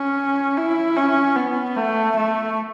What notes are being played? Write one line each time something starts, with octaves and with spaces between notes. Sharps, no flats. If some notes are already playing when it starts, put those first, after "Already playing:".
Already playing: C#4
E4
C#4
B3
A3
A3